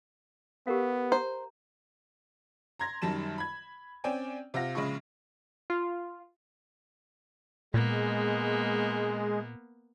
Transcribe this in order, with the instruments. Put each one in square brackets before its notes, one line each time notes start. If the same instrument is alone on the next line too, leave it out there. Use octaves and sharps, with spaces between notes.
[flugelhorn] B3 [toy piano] G4 A#4 F5
[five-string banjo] C5 [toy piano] A#5
[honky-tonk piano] A#5 C6 G#6 A#6
F#2 D#3 G3 A5 E7
B5 G#6
C4 C#4 D5 G5 G#5
C3 F4 F#5 A#6
A#1 C#3 G#3 B5 C#6
[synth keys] F4
[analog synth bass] A#2 [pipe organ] G#3 [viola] A#3 B3